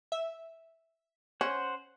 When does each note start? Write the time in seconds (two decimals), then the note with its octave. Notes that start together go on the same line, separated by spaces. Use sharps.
0.12 E5
1.41 C#4 C5 F#5